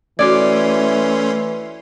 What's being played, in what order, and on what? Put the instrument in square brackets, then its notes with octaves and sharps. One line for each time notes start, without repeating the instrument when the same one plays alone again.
[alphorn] E3 [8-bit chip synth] A3 C#4 C6 [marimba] F#4 D6 G#6 [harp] D5